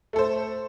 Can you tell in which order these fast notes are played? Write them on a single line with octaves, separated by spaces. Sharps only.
A3 A4 C5